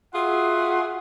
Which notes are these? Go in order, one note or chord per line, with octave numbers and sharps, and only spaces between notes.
F4 F#4 G#4 E5 F#5